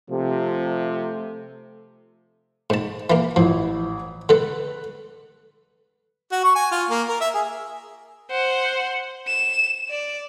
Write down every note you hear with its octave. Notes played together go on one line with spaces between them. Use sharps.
C3 F3 A3
G#2 A5
E3 A#3
A1 F3 E4
D3 A4 B4
F#4
C#6
G#5
F4
A#3
A#4
E5
G#4
C5 F#5
E7
D5